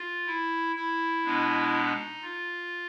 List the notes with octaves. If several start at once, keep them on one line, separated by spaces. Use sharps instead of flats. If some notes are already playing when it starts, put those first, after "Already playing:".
Already playing: F4
E4
E4
B2 G#3 B3 D4
D#4
F4